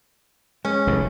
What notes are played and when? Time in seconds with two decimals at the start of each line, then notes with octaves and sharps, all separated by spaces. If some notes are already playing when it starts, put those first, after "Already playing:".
0.65 G#3 C#4
0.87 F1 D#2 A2